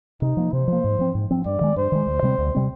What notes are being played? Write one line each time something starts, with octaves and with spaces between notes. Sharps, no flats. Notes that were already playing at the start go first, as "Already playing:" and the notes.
C3 D#4
F3 A#3
C3 C5
F3 A#3
G#2
F3 C4
G#2
F3 C4
G2 D5
D#3 G#3
G2 C5
D#3 G#3
D2
C3 G3 C4
D2
C3 G3 C4